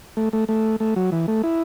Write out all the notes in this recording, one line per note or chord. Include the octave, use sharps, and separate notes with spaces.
A3
A3
A3
A3
F#3
E3
A3
E4